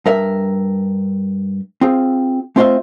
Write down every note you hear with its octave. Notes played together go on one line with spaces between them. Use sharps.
G2 A#4 E5
C4 F4 G#4
A3 C4 F4 C5 D#5 E5